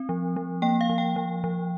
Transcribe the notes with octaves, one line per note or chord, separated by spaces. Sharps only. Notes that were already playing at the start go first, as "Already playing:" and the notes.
Already playing: C4
F3
F3
A#3 G5
F5
F3
G5
F3
F3